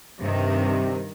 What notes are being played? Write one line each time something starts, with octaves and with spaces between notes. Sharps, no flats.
G2 C3 D#3